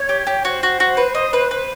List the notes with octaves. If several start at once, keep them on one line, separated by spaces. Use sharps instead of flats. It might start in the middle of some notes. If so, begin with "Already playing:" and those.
Already playing: C#5
G4
G4
F#4 C5
F#4
F#4
B4
D#5
B4
B4